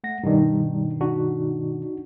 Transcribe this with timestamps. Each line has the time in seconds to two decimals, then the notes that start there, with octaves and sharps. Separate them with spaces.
0.04 A3 F#5 A#6
0.23 G2 B2 D#3 G3 D4 D#4
1.01 D4 D#4 F#4